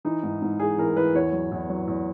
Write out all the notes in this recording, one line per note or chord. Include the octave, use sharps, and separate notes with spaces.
E3 D#4
G#2
G#2
E3 G#4
E3 A#4
E3 B4
E2 C#5
F#3
E2
F#3
E2